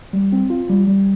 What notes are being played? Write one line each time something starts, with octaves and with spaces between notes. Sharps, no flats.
G3
C4
F4
G3
G3